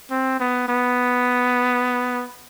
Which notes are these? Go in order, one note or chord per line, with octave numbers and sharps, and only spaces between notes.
C4
B3
B3